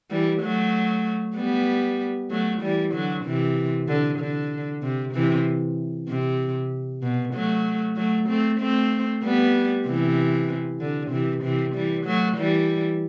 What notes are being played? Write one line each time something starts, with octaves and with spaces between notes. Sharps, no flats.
E3 G3
F#3 A3
G3 B3
F#3 A3
E3 G3
D3 F#3
C3 E3
D3
D3
C3
C3 E3
C3
B2
F#3 A3
F#3 A3
A3 C4
A3 C4
G3 B3
C3 E3
D3
C3 E3
C3 E3
E3 G3
F#3 A3
E3 G3